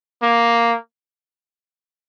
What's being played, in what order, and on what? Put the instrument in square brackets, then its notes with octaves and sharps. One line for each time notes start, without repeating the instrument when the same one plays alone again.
[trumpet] A#3